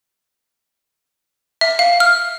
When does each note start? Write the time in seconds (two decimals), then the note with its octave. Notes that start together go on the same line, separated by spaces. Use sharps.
1.61 E5
1.79 F5
2.00 F6